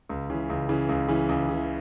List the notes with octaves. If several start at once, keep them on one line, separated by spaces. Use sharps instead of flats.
C#2
C#3 E3
C#2
C#3 E3
C#2
C#3 E3
C#2
C#3 E3